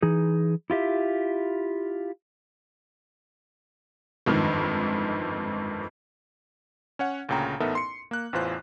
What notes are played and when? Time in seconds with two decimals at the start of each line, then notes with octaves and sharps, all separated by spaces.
0.02 E3 D#4 G#4
0.70 E4 F4 G4 E5
4.26 G1 F2 G#2 D#3
6.99 C#4 C#5 F#5
7.29 D2 A#2 C#3 G5 A#5
7.60 A1 B3 D#4 A4 A#4 E5
7.75 C6 C#7
8.11 A#3 F#6
8.33 A1 E2 E3 F4 C5 F#6